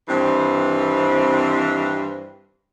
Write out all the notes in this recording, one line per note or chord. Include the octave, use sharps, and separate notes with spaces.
G2 D#3 E3 C4